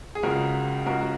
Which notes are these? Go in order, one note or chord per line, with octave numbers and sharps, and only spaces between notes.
G#4
C#2 C#3 F#4 A#4
C#2 C#3 F#4 A#4
F#4